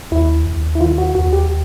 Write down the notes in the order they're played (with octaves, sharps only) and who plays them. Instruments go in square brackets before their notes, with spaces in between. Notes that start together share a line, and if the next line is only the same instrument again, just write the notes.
[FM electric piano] D#2 E4
D#2
E4
D#3 F4
F#4
D#2 F#4
G4